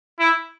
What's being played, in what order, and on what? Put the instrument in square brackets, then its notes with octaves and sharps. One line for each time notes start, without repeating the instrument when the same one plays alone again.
[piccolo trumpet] E4